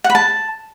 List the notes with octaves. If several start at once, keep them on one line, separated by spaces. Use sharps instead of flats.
F#5
B5
A5